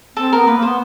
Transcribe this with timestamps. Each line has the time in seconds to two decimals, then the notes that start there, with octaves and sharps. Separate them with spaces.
0.17 C4 A4
0.33 A#4
0.39 B3
0.47 A#3 B4
0.57 A#3
0.62 B3 C5